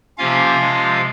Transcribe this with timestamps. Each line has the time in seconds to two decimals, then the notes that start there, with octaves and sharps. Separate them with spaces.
0.18 C3 F3 A#3 C#4 F4 F5
0.58 C3 F3 G#3